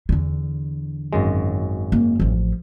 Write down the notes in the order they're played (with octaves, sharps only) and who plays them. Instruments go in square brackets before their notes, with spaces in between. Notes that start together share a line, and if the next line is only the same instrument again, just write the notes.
[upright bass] E2 D3
[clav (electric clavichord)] G#1 F#2 G#3
[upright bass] A#3
A1 F3